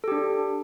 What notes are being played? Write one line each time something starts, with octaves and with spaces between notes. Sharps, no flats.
D4 G4 A4